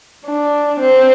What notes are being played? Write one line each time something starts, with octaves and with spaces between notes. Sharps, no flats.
D4
C4